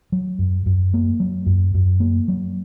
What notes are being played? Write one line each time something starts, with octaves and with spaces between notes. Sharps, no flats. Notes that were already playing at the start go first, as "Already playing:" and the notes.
F#3
F#2
F#2
A#3
F#3
F#2
F#2
A#3
F#3